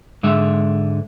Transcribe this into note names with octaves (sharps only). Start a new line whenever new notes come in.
G#2 D3 G#3 E5